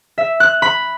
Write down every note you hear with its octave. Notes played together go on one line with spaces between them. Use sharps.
E5
F#6
B5